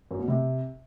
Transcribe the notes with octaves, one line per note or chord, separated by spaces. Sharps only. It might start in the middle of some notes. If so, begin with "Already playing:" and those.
F#2
B2
C3